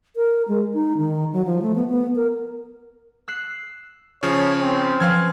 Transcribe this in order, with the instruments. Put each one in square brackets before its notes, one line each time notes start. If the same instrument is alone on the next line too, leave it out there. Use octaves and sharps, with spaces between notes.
[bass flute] A#4
G#3
D#4
D#3
F#3
F3
A3
B3
B3
A#4
[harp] E6 F#6 C7
[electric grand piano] C#3 F3 C#4 [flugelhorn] C#5
[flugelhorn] C4
[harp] F3 C#4 B4 [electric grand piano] F5 F6 G#6